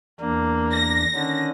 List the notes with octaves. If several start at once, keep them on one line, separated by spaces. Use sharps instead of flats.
E2 A#3 D4
A#6
D3 D#3 C#4 D4